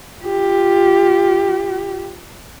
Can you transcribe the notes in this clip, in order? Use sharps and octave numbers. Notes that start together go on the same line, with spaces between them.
F4 G4